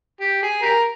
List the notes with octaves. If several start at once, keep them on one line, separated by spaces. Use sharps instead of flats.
G4
G#4
G4 A#4